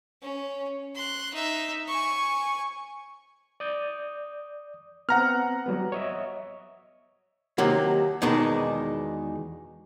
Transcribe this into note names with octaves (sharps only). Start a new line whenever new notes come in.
C#4
C6 F#6
D#4 E5
G#5 C#6
D5 D#6 G6
B3 C4 F#5 A#5 F6
F#3 G3 B3
C#5 D#5 E5
D#2 C3 D#3 F#3 A#3
E2 B2 D#3 G#3 D4 D#4